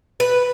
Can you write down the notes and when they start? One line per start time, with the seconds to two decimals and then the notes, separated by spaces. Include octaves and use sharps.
0.20 B4